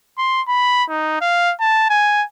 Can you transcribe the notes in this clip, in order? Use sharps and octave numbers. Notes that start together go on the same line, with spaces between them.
C6
B5
D#4
F5
A5
G#5